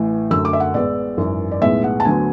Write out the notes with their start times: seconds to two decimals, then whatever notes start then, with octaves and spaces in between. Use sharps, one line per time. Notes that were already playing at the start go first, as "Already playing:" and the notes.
Already playing: A1 A2 E3
0.31 F#2 D3 F#3 A3 E6
0.45 D6
0.53 E5
0.60 F#5
0.74 A1 A2 G#3 B3 D5
1.17 G#1 F#2 E3
1.51 D5
1.61 B1 A2 G#3 B3 E5
1.84 F#5
2.00 A5
2.05 D2 D3 F#3 B3 G#5